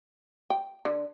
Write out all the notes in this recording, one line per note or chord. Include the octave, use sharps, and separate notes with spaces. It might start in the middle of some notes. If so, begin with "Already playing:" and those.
G5
D3